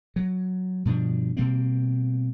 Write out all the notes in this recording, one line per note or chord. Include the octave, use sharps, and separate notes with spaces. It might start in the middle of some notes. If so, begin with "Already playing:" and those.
F#3
G2 B2 F3 D4
B2 G3 A#3 C4